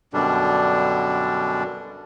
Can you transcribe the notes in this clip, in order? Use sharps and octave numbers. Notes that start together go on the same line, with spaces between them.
F#2 B2 D3 G3 D4